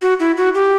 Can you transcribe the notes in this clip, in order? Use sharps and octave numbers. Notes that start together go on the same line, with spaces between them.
F#4
E4
F#4
G4